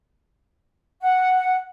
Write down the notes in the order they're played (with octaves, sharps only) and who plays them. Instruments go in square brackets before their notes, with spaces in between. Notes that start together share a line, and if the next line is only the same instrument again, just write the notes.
[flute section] F#5